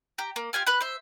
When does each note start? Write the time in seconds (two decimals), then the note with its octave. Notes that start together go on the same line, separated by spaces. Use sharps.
0.18 G4 A#5
0.36 A#3
0.53 F4 G4 G#5 F6
0.66 B4 B5 F#6
0.81 C5 E5